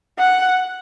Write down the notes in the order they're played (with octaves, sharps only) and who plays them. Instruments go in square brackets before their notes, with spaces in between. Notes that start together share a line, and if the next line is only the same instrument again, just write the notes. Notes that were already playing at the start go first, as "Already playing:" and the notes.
[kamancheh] F#5